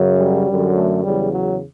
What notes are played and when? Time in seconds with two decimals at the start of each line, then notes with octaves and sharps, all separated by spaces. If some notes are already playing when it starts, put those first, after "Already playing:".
Already playing: F#2 C#3 F#3
0.17 G3
0.46 F#2 D3 F#3
0.75 A3
1.04 E2 C#3 F#3 G3
1.33 F#3